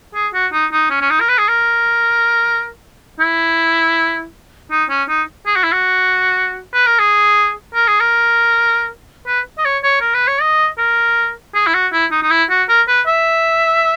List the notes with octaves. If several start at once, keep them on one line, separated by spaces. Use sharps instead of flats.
G#4
F#4
D#4
D#4
C#4
C#4
D#4
A#4
B4
G#4
A#4
E4
D#4
C#4
D#4
G#4
F#4
E4
F#4
B4
A#4
G#4
A#4
G#4
A#4
B4
D#5
C#5
C#5
A#4
B4
C#5
D#5
A#4
G#4
E4
F#4
E4
D#4
D#4
E4
F#4
A#4
B4
E5